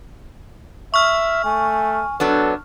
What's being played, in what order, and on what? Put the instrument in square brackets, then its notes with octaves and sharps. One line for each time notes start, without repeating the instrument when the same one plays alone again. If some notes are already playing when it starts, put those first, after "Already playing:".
[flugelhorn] E5 [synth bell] C#6 F6
[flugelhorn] A3 [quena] G#5
[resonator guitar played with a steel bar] F#3 B3 D4 [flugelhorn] A4